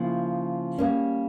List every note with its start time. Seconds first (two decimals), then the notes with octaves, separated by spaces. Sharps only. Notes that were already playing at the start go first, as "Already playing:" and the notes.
Already playing: C#3 F3 A#3 E4
0.78 G3 A#3 C#4